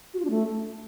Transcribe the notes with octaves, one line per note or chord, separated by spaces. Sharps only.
F#4
F4
D4
A3